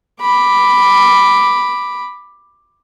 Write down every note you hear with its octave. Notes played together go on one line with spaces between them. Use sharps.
B5 D6